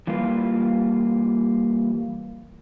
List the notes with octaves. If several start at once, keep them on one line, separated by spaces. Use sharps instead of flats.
E3 G3 A#3 F4 B4